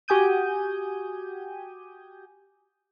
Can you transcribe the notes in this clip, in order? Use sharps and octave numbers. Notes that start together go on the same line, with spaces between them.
F#4 G4 G#5 D#6 G6 D#7